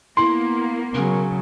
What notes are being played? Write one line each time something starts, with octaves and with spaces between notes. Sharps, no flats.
A#3 B3 E4 C6
C#3 F#3 A#4